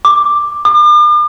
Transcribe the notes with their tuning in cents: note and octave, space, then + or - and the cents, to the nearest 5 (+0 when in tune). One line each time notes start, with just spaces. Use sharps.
D6 +5
D6 +45